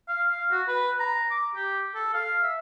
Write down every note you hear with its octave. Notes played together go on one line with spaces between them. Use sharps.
F5
F5
F#4
B4
A#5
D6
G4
A4
F5
E5